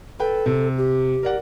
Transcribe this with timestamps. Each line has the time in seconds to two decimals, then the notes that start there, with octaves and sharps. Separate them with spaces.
0.20 A4 B4 G5
0.46 C3
0.78 G4
1.23 A#4 D5 F#5